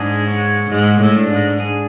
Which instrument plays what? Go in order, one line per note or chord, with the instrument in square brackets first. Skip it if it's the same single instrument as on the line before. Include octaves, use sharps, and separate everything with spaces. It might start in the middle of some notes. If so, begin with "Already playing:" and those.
Already playing: [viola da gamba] G#2 [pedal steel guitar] D4 G#4
[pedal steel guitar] C#5
[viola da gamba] G#2 [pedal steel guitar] G#3
[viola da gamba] A2
[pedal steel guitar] D4
[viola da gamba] G#2
[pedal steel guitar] G#4